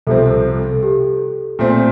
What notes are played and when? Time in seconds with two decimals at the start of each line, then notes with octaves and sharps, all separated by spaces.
0.07 C2 C3 F3 C4 A4
0.26 A4
0.64 A4
0.83 G4
1.59 A#2 A3 C4 F4